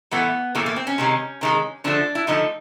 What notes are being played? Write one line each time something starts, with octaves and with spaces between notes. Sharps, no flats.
A2 E3 A3 B3
A2 E3 A3 A#3
A#3
C4
C#4
C3 D#3 G#3
C3 D#3 G#3
D3 F3 A3 D4
E4
D3 F3 A3 D#4